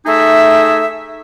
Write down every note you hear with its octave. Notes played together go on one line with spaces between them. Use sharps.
A3 D#4 G#4 E5